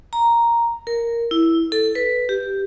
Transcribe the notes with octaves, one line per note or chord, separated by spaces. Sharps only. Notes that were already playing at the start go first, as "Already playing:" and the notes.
A#5
A#4
E4
A4
B4
G4